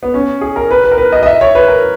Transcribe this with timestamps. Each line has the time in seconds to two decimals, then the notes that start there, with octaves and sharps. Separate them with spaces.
0.03 B3
0.14 C#4
0.41 G#4
0.56 A#4
0.71 B4
0.84 B4
0.92 A#4
0.98 B4
1.12 D#5
1.23 D#5
1.26 E5
1.41 C#5
1.55 B4
1.68 A#4